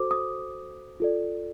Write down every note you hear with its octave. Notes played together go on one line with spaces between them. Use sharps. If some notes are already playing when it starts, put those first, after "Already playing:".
Already playing: F#4 A4 C5 D6
D#6
F4 A4 D5